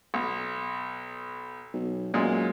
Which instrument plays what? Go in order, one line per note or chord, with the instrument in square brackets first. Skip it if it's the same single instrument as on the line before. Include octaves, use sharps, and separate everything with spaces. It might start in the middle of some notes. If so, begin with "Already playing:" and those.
[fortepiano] B1
[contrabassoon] B1
[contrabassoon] F#2 [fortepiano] A#2 G#3